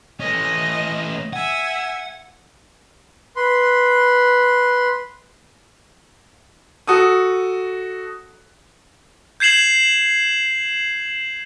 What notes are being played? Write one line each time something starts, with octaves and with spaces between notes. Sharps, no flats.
A3 C#4 D#5
E5 F#5 G#5
B4 C6
F#4 A4 D#6
G6 G#6 C7 E7 F#7